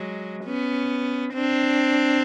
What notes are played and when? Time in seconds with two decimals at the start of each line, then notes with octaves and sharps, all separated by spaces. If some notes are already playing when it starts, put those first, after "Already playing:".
Already playing: F#3 G#3
0.45 B3 C#4
1.34 C4 D4